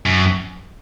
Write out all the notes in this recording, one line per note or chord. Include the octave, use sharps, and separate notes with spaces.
F#2